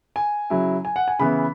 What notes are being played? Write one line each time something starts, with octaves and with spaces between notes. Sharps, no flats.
G#5
C#3 F#3 E4
G#5
F#5
G#5
C#3 E3 B3 E4 B5